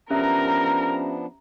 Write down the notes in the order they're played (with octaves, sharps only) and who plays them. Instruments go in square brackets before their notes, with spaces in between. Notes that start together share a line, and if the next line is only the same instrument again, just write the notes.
[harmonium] F3 B3 D4 [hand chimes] C#4 G4 E5 [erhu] A#4 [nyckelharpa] A#5